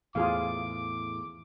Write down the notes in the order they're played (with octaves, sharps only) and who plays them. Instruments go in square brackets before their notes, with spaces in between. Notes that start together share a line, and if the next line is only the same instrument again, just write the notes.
[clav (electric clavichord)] E2 [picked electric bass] A2 [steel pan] F4 G#4 F5 [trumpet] D6